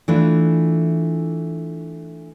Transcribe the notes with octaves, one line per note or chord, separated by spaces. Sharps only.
E3 A3 D4 F4 B4